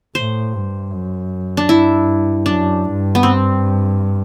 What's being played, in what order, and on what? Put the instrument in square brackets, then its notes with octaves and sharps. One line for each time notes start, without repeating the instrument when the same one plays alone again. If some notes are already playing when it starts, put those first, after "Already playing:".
[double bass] A2 [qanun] C5
[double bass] G2
F#2
[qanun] D4
[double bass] G2 [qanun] E4
[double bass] F#2 [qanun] D4
[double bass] G2
[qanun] B3
C4